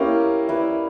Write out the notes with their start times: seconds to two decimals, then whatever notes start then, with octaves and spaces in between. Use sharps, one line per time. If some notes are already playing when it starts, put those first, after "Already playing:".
Already playing: A#3 C#4 E4 G4 A#4
0.49 E4 B4 D5